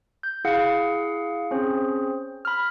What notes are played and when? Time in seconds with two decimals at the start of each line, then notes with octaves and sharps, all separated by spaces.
0.23 G6
0.45 E4 G#4 F5 F#5
1.51 C4 C#4 G#4 C5
2.45 B5 F6